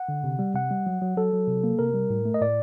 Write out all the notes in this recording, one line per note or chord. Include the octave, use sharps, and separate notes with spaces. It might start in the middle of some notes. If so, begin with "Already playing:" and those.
Already playing: F#5
D3
C3
G3
C3 F#5
G3
F#3
F#3
F#3 A4
F#3
C3
A#3
C3 A#4
G3
A2
A3
D#5
A2 D5